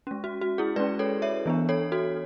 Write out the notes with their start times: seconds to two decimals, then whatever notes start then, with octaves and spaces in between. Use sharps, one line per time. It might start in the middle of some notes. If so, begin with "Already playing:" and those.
0.07 G#3 C#4
0.24 F#4
0.41 F#4
0.58 E4 G#4
0.76 G#3 C#4 B4 D5
0.99 A4 C#5
1.22 C#5 E5
1.46 E3 B3 D4
1.69 A4 C#5
1.92 F#4 A4